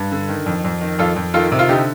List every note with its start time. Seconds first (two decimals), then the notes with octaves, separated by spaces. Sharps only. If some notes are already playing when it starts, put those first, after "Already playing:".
Already playing: G2
0.12 D3
0.29 D#3
0.46 F2
0.64 F2
0.81 D#3
0.99 F2 F4 A4
1.16 F2
1.34 D#3 F4 A4
1.52 C3
1.59 F4
1.69 D3 D#4 G4